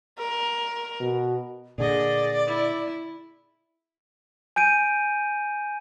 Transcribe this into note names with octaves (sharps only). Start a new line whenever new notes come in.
A#4
B2
A#2 D3 G#4 D5 D#5
E4
G#5 G6 D7 D#7